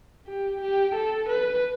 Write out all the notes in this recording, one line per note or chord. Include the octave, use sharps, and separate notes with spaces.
G4
G4
A4
B4